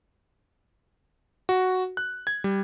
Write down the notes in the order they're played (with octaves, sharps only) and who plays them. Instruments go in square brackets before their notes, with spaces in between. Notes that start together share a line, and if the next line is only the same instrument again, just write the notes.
[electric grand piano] F#4
F#6
G#6
G3